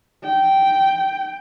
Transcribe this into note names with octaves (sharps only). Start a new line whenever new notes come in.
G5